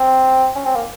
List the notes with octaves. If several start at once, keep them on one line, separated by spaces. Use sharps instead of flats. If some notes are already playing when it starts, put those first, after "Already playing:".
Already playing: C4
C#4
C4
A#3